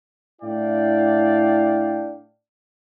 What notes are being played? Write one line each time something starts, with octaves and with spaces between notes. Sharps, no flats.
A2 D4 E4 D5 F5 G5